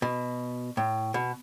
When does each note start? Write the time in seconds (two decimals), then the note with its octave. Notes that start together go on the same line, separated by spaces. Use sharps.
0.02 B2
0.77 A2
1.14 B2